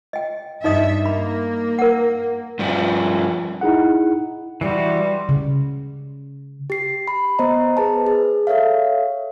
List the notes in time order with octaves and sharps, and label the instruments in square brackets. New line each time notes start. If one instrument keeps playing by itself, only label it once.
[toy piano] D#5 G5
[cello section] G2 E5 [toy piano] D#4 D#5 D#6
[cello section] A#3 [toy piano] B5
[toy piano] A#4 F#5
[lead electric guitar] G2 F3
[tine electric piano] D#4 E4 G#4 F#5
[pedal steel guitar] E3 F#4 [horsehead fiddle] G3 [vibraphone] D5 C6
[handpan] C#3
[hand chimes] G4 C7
B5
B3 C5 D#5 A#5
G#4 B4 A5
G#4
A4 C#5 E5 F5